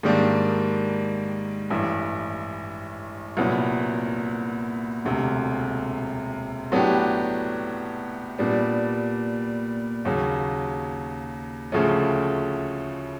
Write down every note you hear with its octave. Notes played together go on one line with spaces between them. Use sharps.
G#2 D#3 G3 A#3 D4
A1 G2 E3
C2 A#2 F#3 B3
E1 D2 C3
A2 F#3 B3 D4 G4
A#2 G3 B3 D4
D#2 C#3 F#3
D2 C#3 F3 A3 C#4